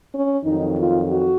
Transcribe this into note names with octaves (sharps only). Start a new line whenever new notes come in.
C#4
F2 D#3 F#3 D#4
F4
F#4